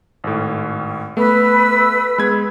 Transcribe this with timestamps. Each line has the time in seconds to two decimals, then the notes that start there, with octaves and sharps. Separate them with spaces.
0.24 G#1 A2
1.17 A3 B3 B4 E6
2.18 G#3 B3 G#6